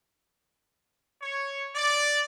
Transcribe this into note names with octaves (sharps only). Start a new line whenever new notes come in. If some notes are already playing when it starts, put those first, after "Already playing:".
C#5
D5